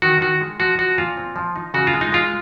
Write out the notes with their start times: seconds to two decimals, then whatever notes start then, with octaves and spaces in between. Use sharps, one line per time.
0.02 D#3 F#4
0.21 D#3 F#4
0.41 G#3
0.60 F3 F#4
0.79 F3 F#4
0.98 A#2 F4
1.17 C4
1.36 F3
1.56 D#4
1.74 C#3 F#4
1.87 F4
1.94 G#3
2.01 D#4
2.12 G#3 F4